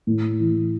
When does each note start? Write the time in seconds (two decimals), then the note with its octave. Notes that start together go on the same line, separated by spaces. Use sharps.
0.07 A2
0.40 E3